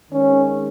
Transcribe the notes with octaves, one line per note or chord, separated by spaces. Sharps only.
D#3 G#3 C4 C#4